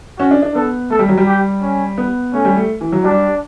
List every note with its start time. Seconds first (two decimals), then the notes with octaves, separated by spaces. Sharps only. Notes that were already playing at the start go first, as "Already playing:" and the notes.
0.19 C#4 F#4
0.31 D4
0.42 D4
0.55 B3 A4
0.90 A3 A4
0.99 G3
1.09 F#3
1.17 G3
1.27 G4
1.62 C#4
1.98 B3
2.33 A3 C#4
2.45 G3
2.56 A3
2.81 E3
2.92 F#3
3.04 G3 D4